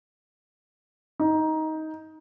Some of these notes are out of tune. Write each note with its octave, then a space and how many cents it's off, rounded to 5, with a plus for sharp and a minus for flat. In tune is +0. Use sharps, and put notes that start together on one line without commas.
D#4 +15